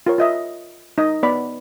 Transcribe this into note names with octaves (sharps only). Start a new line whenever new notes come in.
F4 A#4 C#5
F4 D#5 E5
D#4 D#5
B3 D5 B5